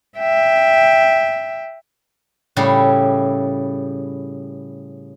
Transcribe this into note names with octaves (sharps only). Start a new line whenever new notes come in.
E5 G5
A2 C#3 G3 E4 G4